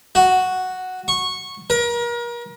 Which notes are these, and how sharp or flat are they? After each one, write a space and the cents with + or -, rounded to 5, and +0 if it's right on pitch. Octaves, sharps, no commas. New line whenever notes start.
F#4 +0
C#6 -15
A#4 +35